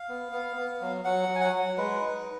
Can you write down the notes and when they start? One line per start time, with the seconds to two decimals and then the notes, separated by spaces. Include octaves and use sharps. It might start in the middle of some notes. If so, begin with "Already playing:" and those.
Already playing: F5
0.09 B3
0.32 B3
0.56 B3
0.81 F#3
1.05 F#3 F#5
1.29 F#3
1.35 G#5
1.41 F#5
1.53 F#3
1.77 G#3 B4
2.01 D#4